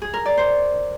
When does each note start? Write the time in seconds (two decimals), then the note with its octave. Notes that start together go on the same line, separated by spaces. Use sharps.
0.02 G#4
0.14 A#4
0.26 D5
0.37 C5